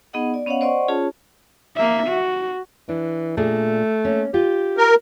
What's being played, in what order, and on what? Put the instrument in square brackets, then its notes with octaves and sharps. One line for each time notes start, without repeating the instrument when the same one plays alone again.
[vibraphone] B3 D#4 G#4 D#5 F#5
D5
B3 C#4 C#5 D#5 F5 F#5
C5 D5 D#5 F#5 C6 C#6
C#4 F4 G#4 C#5 A5
[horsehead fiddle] A#3 E5
F#4
[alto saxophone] E3 [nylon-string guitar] D4
[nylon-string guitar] A#2 D4 G#4 [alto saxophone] A3
[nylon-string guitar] A#3 C#4
[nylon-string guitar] F4 [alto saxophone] G4
[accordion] A#4